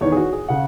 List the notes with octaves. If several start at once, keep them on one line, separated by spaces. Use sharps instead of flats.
E2 D#3 C#5
G#4
F#4
G#4
C#3 F#5